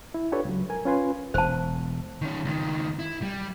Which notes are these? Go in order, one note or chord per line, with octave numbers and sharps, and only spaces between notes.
E4
D4 F4 G4 A4 B4 C#5
C#2 F#3
A#4 G#5
C#4 F4 B4 G#5 C6
E1 C5 A5
D#3 C#4
C#2 D#3
E4
G3